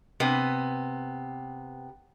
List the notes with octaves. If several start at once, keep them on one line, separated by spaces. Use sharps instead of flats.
C3 B3